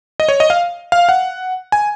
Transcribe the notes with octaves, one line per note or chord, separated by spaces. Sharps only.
D#5
C#5
D#5
F5
F5
F#5
G#5